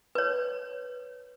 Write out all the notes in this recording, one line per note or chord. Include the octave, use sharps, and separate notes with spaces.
B4 C#5